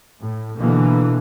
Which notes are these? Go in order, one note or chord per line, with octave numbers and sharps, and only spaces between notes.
A2
B2 D3 E3 A#3